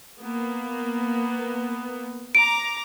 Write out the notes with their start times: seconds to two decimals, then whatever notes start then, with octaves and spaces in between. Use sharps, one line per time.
0.21 A#3 B3
2.35 A#5 D6 D7